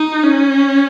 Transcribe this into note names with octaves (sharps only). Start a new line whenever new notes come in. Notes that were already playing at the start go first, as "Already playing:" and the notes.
Already playing: D#4
C#4